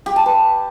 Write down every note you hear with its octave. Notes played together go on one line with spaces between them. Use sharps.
G4
A5
B4